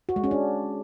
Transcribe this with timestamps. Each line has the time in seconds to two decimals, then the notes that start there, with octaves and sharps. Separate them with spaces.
0.09 F#4
0.16 G#3
0.24 C#4
0.31 D4